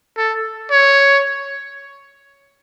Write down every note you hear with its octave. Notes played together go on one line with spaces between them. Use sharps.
A4
C#5